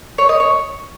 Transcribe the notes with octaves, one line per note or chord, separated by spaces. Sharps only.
C#5
D#5
C#5